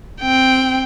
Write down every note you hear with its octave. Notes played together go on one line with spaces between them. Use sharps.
C4 G5